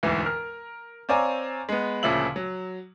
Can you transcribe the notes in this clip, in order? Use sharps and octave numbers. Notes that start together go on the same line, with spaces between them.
E1 D2 G#2 E3
A#4 F6
C4 C#5 D5 F5 G#5 A#5
G#3 B3
D2 A#2 C#3 F3 E5 F#7
F#3